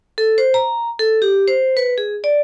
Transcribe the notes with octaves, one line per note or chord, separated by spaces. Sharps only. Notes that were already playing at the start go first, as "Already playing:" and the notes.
A4
C5
A#5
A4
G4
C5
B4
G#4
D5